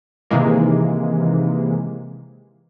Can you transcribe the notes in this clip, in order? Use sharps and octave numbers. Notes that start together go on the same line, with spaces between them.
C3 D#3 E3 G#3 A#3